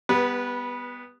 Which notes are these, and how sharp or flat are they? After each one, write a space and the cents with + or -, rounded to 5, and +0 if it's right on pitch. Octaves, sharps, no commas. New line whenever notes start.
G3 +30 B3 +0 B4 -20